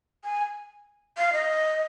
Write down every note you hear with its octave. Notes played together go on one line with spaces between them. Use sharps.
G#5
F5
D#5